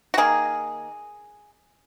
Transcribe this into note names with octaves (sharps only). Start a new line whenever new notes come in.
F#4
D#3 A#3 G#4